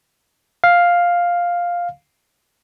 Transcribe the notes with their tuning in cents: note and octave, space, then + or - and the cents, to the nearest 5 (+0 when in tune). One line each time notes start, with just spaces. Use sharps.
F5 +5